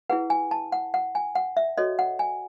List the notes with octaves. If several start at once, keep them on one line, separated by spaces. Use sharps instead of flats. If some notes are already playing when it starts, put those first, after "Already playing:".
E4 G#4 B4 F#5
G#5
A5
F#5
F#5
G#5
F#5
E5
F#4 A4 C#5 D#5
F#5
G#5